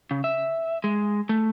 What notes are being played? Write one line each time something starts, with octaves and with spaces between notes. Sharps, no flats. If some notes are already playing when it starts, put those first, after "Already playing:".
C#3
E5
G#3
A3